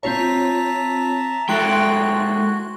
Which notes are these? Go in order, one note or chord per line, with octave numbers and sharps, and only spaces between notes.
C4 F4 C#5 E5 A5 A#5
G#3 E4 F#4 A4 G5 C6 F#6